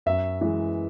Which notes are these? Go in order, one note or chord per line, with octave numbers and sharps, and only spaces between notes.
F#2 E5
E3 G#3